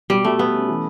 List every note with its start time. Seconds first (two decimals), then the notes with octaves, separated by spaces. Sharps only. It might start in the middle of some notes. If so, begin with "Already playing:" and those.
0.10 B2 G3
0.24 B2 A3
0.39 G3 B3
0.54 C#4
0.69 E3